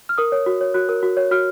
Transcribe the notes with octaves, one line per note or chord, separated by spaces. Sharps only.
F6
A#4 D#6
C#5
F#4
C#5
F#4 F#6
A#4
F#4
C#5
F#4 F6